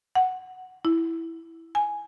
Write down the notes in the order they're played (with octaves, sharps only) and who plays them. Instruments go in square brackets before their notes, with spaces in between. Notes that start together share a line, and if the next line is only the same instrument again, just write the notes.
[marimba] F#5
E4
G#5